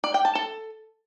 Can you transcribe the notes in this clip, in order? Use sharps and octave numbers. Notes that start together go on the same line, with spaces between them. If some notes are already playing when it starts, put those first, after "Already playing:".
D5
G5
A5
A4